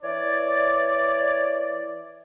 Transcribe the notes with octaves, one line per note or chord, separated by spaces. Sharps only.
E3 C#5 D5